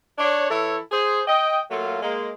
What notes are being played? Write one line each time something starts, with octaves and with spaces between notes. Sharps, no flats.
D4 C#5
E3 E4 A4 C#5
G#4 C5
D#5 G5
F#3 A3 A#3 F4
G#3 A#3